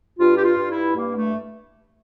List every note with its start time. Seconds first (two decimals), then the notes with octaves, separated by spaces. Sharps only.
0.18 G2 F4
0.37 G4
0.43 F4
0.57 G2
0.70 E4
0.96 G2 A#3
1.15 A3